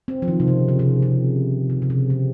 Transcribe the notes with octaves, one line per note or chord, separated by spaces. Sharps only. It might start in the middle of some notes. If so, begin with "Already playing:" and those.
C4
F3
D#3
C3
C#3
C#3
C3
C3
C#3
C#3
C3
C#3